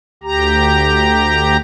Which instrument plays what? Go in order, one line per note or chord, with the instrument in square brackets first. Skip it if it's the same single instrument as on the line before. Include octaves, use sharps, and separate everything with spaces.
[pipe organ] D2 G4 A#5